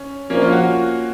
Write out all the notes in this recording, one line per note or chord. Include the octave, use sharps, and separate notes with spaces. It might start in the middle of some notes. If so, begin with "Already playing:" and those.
Already playing: C#4
A#1 A#2 F3 A#3 C#4
C#4 F4
F#4